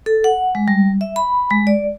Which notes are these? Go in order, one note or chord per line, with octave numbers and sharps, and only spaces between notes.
A4
F#5
G#3
G3
E5
B5
G#3
D5